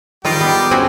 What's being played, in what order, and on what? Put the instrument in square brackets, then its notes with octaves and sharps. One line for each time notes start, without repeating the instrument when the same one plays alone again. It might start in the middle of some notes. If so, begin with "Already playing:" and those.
[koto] D#3 F4 A#5 [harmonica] G3 G4
[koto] B3
C4 C#4 F#4